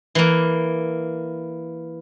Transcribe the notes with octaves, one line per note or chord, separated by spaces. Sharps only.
E3 A#3